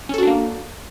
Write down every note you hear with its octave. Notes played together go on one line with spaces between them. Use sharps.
A#3 C#4 D4 F#4 A4